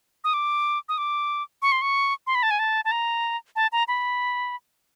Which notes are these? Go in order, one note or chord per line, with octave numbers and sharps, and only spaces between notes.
D#6
D6
D#6
D6
C#6
C6
C#6
C6
B5
A5
G#5
A5
A5
A#5
A5
A#5
B5